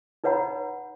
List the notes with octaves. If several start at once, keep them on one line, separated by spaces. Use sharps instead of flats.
D#4 B4 C#5 F#5 A#5 B5